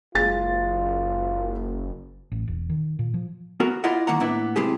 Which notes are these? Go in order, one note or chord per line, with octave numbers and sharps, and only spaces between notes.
F#1 G#3 F4 A6
A1
E1
D#3
A#2
F3
B3 F#4 A#4
E4 F4 A#4 D5 D#5 F#5
B1 D#3 A#3 F#5 A#5
A2 A#3 B3 D4 E4
B1 C3 G#3 E4 G4 G#4